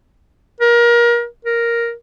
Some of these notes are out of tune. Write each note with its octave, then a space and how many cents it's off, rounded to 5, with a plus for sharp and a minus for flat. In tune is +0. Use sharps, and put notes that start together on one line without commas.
A#4 +30
A#4 +5